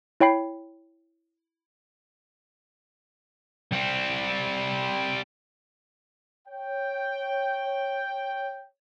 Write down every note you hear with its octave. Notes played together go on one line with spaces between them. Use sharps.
E4 C#5 G5 B5 C7
G3 C4
C#5 G5